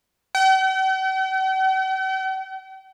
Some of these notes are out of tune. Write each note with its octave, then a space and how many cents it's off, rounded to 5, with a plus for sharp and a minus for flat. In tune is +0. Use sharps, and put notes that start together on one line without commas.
G5 -45